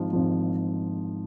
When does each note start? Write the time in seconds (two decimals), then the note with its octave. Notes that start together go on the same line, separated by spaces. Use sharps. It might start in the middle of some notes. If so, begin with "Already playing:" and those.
Already playing: G#1 G#2 F3
0.13 G#1 G#2 F3